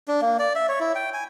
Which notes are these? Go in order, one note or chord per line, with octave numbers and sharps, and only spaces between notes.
D4
A#3
D5
E5
C#5
E4
G5
G#5